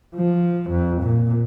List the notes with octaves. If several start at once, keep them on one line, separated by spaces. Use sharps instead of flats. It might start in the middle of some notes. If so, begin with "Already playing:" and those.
F3
F2
A#2